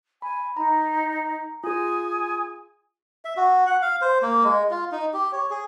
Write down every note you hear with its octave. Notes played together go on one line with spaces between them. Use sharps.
G#5 B5
D#4 A#5
F4 G#4 G#5 D#6
E5
F#4
F#5
F5
C5
A#3
G#3
F4
D#4
G4
C#5
G#4